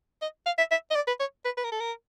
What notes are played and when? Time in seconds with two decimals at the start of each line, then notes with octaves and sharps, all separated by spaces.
0.22 D#5
0.46 F5
0.58 E5
0.71 E5
0.91 D#5
0.95 D5
1.07 B4
1.20 C#5
1.45 B4
1.57 B4
1.64 A#4
1.72 A4
1.80 A#4